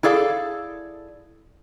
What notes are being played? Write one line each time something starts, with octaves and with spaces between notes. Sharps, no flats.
E4 G#4 A4 D5 F5